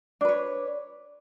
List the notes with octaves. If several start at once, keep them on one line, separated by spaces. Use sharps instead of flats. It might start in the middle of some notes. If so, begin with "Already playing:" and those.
D4 B4 C#5